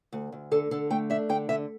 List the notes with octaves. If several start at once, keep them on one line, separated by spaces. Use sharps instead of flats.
D2
D2
D3 A4
D3 A4
A3 G5
D4 E5
D3 G5
D3 E5